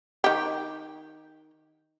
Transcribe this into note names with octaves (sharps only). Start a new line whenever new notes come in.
D#3 G4